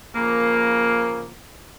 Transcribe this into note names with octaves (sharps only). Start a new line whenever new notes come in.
C#3 F3 A#3